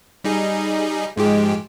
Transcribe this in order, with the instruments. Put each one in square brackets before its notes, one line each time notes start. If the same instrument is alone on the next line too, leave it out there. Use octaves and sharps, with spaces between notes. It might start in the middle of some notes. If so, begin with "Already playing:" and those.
[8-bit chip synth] G3 D#4 G#4
[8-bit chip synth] G#2 F3 G4 [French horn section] G#3